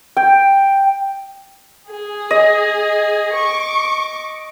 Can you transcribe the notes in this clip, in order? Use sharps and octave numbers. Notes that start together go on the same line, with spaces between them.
G5
G#4
D#5
C#6 D6